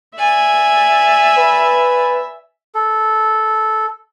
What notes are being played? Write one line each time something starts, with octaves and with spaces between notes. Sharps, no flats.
D5 E5 G#5
B4
A4